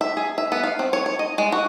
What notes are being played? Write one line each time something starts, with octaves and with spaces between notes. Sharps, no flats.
E5
G#4
E5
B3
F5
C4
C#5
C#5
D#5
G#3
F#4